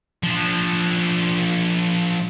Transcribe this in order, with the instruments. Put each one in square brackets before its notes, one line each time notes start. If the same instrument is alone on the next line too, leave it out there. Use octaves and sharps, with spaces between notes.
[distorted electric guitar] F3 D4